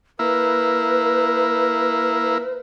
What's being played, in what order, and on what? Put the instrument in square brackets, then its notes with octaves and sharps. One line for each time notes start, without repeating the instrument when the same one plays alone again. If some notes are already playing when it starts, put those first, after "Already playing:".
[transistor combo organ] A#3 E4 [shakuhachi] B4